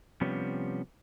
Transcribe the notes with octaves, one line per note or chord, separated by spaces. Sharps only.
C3 F3 G3 B3 C#4